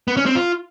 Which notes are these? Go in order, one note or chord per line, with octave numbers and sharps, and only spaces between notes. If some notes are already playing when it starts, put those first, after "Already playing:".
B3
C#4
C4
F4